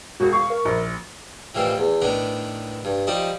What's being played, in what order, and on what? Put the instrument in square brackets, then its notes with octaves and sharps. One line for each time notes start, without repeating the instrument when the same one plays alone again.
[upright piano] E1 [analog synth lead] F#4
[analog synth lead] F5 [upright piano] C#6
[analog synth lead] A#4
[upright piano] A#1
[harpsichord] A2 D#3 E3 G3 F4 C5
E2
A2 D#3 B3 D4 A#5
G2
F3 G3 D#4 D5 D#5 A5